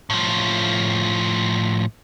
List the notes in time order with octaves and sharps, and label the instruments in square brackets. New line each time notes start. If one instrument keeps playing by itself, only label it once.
[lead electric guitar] A2 F3